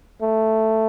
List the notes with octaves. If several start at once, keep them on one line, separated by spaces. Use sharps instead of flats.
A3